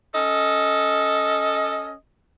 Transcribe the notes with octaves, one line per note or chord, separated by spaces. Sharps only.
C#4 A4 D#5